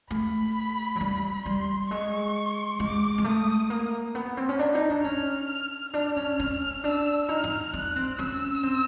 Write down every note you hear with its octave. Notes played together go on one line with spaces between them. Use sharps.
A3 B5
F#3
G3
G3 C6
G#3 C#6
G#3 D6
G#3
A3 D#6
A#3
B3
C4
C#4
D4
D#4
D4
C#4 F6
D4 F6
C#4
C#4
D4 E6
D#4 F6
D#4
D4 F#6
C4
C#4 E6
C4